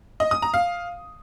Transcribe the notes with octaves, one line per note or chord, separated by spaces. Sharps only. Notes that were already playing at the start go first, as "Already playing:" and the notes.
D#5
D#6
A#5
F5